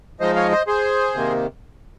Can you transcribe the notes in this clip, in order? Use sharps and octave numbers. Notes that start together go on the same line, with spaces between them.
F3 G#3 D#4 C5 D#5
C#5 F5
C5 D#5
G#4 C5
C3 D#3 A#3